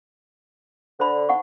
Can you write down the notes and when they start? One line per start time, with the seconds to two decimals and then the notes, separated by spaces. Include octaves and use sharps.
1.00 D3 C5 B5
1.29 D#4 F#5 C#6